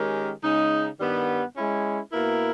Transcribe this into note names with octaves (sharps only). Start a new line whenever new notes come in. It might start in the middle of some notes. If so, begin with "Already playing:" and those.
Already playing: D#3 G#3 C#4 G4 A#4
C#3 G#3 D#4
G2 D#3 G3 B3
G#3 C#4 E4
B2 A#3 E4 A#4